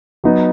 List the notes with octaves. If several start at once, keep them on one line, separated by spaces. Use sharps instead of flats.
F#3 B3 D#4